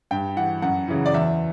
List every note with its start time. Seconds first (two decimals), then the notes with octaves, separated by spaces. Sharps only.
0.11 G2 G5
0.36 E3 F#5
0.62 F#2 F#5
0.88 C#3 E3
1.06 D5
1.14 E2 E5